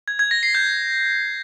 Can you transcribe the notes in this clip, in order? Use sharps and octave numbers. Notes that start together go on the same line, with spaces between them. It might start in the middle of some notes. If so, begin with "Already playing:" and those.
G#6
G#6
A#6
C7
G6